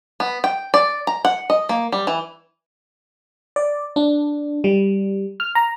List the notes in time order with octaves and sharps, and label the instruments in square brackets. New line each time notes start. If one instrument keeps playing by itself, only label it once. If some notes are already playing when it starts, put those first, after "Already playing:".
[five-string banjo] B3
G5
D5
A#5
F#5
D#5
A#3
G3
E3
[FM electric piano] D5
D4
G3
F6
A#5